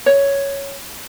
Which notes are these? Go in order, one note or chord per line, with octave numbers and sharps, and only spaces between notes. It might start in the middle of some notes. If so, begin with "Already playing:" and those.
C#5